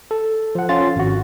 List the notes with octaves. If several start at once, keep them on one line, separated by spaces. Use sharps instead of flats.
A4
F3 F#5
C#4 F4 A6
G#1 F#4